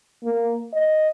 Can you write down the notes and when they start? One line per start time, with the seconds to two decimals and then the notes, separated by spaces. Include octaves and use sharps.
0.24 A#3
0.73 D#5